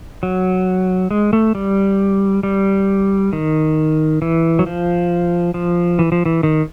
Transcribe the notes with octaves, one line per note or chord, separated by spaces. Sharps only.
F#3
G#3
A3
G3
G3
D#3
E3
F#3
F3
F3
E3
F3
E3
D#3